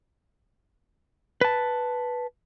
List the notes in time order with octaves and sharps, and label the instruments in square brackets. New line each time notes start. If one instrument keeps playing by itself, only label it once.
[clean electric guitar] B4 A5